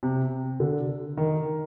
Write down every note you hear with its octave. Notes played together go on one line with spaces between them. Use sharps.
C3
D3
D#3